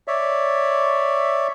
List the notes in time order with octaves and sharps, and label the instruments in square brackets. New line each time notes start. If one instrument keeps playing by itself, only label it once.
[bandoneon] C#5 D5 E5